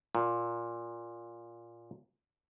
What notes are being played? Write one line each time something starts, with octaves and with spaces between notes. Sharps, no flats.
A#2